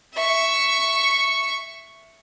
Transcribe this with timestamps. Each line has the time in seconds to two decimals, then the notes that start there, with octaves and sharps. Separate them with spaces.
0.14 E5 C#6